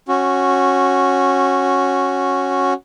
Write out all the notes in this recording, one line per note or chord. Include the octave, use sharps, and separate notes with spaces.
C#4 F#4